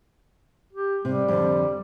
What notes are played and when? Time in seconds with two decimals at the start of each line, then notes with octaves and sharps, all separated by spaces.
0.73 G4
1.05 C3 G3
1.28 F2 D3